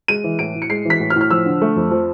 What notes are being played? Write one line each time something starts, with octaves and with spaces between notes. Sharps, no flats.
G#3 D#7
E3
A2 D7
A2
C#7
G#3 C7
E3
B6
A2
F6
A2
F6
F3 E6
D3
A3
F2
F3